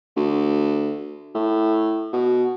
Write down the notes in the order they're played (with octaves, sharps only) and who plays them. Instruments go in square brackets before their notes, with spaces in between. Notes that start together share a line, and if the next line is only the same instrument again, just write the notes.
[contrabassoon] D2
A2
B2